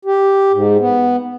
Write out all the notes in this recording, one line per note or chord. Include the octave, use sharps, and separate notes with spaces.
G4
G#2
B3